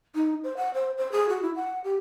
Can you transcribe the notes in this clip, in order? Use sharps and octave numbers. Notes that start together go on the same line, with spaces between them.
D#4
C5
F#5
C5
C5
G#4
F#4
E4
F#5
G4